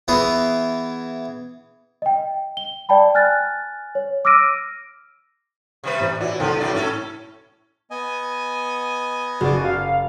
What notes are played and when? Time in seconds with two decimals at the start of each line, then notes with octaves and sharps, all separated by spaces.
0.08 E3 B3 E4 G#4
2.02 D#5 G5
2.57 G7
2.89 D5 G5 A5 B5
3.15 G#5 F6 F#6 A6
3.95 C#5
4.25 D6 E6 F6 A#6 D7 D#7
5.84 C3 G3 B4
6.00 A1
6.21 E3 F#4 C#5 D5
6.40 C2 D3 F3 B3 A4 G5
6.60 E3 F#3 D5
6.74 A2 A3 C#4 A4
7.91 B3 D#5 G#5
9.41 F#1 F#4 D5
9.65 F5